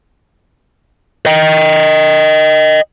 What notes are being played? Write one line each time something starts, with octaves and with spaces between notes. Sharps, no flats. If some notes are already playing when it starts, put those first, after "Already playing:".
D#5 G5